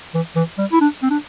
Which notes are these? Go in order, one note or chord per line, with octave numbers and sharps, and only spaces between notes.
E3
E3
G3
E4
D4
C4
D4